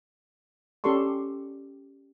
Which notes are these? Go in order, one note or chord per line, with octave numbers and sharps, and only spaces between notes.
C#4 G4 A4 D5 C6 C#6